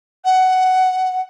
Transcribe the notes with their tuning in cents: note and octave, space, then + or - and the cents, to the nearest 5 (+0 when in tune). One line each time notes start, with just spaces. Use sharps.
F#5 +10